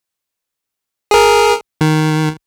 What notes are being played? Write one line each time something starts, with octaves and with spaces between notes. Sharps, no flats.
G#4 A#4
D#3